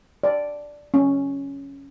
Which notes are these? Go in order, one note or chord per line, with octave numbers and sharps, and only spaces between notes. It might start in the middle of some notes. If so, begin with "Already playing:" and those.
D5
C#4